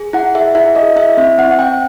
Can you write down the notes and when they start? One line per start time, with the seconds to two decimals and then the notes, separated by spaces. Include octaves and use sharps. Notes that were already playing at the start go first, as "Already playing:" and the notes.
Already playing: G#4
0.13 E4 F#5
0.35 G#4 E5
0.55 E4 E5
0.75 G#4 D#5
0.96 E4 E5
1.17 C4 E5
1.38 C4 F#5
1.59 C4 G5